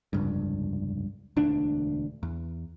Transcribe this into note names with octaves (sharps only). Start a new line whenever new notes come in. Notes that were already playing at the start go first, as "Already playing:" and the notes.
F1 C#2 G2
E1 D2 D4
E2